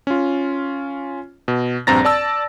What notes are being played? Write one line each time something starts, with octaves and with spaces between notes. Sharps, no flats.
C#4 F4
B2
A#1 G2 C4 A#5 A6 A#6
D5 A5 E6